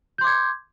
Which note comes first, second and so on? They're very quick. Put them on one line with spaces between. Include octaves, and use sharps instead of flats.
G6 C6 D6 G#6